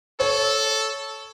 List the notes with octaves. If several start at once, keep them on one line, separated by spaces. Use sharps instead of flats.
A4 C#5